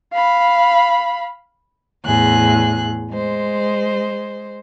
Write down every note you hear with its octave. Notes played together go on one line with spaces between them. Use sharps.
F5 B5
E2 A2 G#4 F#6
G#3 C5